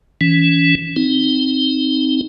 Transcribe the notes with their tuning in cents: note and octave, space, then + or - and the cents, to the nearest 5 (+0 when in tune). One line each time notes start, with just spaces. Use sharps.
E3 +0 C#4 +25
C4 +0 D#4 +0